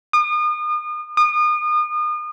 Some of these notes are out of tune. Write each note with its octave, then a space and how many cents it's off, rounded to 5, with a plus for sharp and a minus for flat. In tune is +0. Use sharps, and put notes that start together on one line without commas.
D#6 -40
D#6 -35